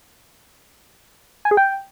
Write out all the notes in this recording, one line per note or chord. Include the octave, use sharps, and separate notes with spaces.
G#5
G#4
G5